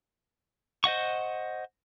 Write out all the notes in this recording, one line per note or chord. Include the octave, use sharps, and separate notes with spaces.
C5 D#5 F#5 C#6